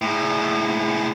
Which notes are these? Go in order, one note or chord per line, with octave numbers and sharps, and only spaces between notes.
A2 G#3